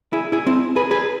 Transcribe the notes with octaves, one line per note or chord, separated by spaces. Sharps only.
E4 G#4
E4 G#4
C4 E4
G#4 B4
G#4 B4